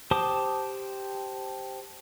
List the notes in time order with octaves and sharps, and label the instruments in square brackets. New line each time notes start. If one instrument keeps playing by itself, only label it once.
[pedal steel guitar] G4 C5 A5 D6 D#6